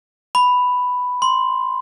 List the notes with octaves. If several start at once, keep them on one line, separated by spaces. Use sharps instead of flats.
B5
C6